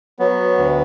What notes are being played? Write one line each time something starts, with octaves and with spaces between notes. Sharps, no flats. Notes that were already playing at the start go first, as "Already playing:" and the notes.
F#3 B3
D2